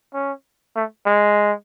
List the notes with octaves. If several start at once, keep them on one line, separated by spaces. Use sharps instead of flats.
C#4
A3
G#3